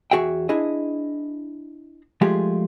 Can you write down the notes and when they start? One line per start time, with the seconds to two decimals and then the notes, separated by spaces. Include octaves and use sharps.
0.11 E2 F#4 G#4 E5 G5
0.49 D4 E4 G#4 D#5
2.21 F3 G#3 A3 F4 G4 G#4